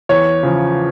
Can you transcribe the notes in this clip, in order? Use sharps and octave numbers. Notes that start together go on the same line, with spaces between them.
E2 C#5
C#3 F3